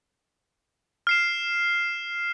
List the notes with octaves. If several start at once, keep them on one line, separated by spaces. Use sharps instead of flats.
F6 C7 E7